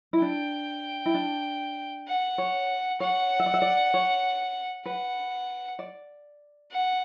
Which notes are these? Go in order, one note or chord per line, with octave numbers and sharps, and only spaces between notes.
E4
D4 G5
E4
D4
F#5
C#5
C#5 F#5
E5
D5
E5
D5
C#5
B4 F#5
D5
F#5